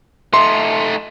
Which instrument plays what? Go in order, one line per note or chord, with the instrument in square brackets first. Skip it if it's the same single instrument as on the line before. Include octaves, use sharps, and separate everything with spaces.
[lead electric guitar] A3 D#4 [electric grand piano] C6